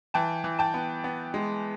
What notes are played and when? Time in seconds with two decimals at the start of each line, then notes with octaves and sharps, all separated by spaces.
0.14 E3 G5 A5
0.44 E3
0.59 G5 A5
0.74 B3
1.04 B3
1.34 G#3